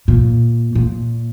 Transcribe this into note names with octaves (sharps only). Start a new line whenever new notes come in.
A#2
A#2